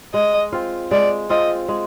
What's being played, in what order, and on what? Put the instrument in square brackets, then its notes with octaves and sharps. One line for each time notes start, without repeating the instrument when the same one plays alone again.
[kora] G#3 [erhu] D#5
[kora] C4 F4
[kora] G#3 [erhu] D5
[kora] C4 F4 [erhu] D#5
[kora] G#3